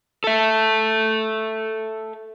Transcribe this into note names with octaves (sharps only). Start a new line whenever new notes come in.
A4 E5